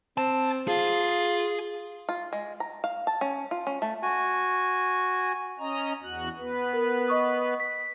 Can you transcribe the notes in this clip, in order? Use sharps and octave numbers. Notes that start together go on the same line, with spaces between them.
C4 A5
F4 G#4
F4
G#3
A#5
F5
A5
C#4
F4
C#4
A3
F#4 G#5
C#4 D#5 A#5
E2 F#4 F#6
B3 B4
A#4
D#5 C#6 D#6
B6